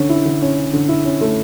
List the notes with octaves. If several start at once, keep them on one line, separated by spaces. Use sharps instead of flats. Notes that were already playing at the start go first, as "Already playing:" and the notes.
Already playing: D3 C#4
E4
D3
C#4
C#4
D3
E4
C#4
A3